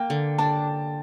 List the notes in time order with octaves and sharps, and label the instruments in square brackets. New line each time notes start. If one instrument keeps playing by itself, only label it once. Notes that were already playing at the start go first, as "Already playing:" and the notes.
Already playing: [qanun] A#3 [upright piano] G5
[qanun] D3
[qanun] D4 [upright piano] A5